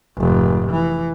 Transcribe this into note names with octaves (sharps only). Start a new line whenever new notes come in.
F1 G#2
E3